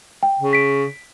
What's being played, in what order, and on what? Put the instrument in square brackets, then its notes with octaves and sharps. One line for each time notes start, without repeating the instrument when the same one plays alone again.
[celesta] G5
[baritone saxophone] C#3
[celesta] B6 D7